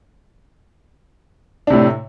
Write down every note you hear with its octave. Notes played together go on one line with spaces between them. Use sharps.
A2 C3 D4